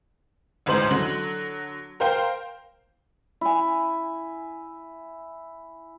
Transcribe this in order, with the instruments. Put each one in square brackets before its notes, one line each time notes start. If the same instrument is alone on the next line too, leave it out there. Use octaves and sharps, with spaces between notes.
[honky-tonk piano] A1 D2 G#2 C5 F#7
D3 F#3 F#7
A#4 C5 F5 G5
[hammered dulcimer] E4 G#5